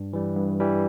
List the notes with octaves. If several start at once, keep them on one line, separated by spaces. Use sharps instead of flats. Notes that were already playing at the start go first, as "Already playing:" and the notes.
Already playing: G2
E3 G3
G2
E3 G3